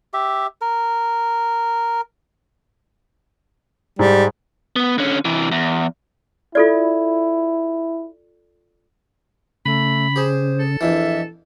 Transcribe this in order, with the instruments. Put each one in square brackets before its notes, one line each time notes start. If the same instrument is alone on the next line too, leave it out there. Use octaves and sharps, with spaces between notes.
[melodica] G4 E5
A#4
[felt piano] G#2 [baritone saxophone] G3
[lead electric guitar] B3
D3 C#4
C3 E3
E2
[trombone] E4 [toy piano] F4 A4 D5
[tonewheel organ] C#3 [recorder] A3 [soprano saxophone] B5
[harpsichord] G4 G#4 [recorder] C5
[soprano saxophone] A4
[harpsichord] A#1 F2 E3 [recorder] E5